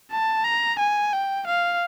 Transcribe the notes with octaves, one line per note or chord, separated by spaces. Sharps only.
A5
A#5
G#5
G5
F5